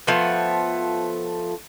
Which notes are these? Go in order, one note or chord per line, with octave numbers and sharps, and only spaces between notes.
F3 A3 B3